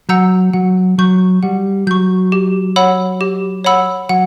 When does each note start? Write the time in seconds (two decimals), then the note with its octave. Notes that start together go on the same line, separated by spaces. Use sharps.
0.09 F#3 F#5 A#5 E6 G6
0.53 F#3 F#5
0.98 F#3 C#6 G6
1.43 G3 F#5
1.87 F#3 C#6 G6
2.32 G4
2.76 C#5 F#5 B5 E6
3.21 G4
3.64 C#5 F#5 B5 E6
4.09 F#3 F#5